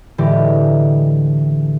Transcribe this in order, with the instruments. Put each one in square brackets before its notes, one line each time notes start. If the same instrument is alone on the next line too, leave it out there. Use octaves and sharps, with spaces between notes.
[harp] A2 D3 E3 G#3 G4